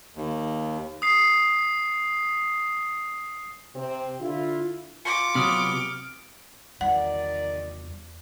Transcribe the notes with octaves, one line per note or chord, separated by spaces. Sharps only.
D#2
D#6 C7
C3 C4
D3 E4 F4
F4 D6 C#7
C3 F#3 B3 D#6 F6 D7
E2 D#3 G3 D5 F#5